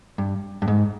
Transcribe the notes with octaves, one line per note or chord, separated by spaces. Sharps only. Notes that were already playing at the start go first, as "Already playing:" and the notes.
G2
G2
G#2